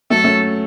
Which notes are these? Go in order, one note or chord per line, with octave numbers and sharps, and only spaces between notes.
F#3 A3 A4
A3 C#4